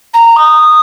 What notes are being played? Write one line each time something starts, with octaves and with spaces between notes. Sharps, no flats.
A#5
D#6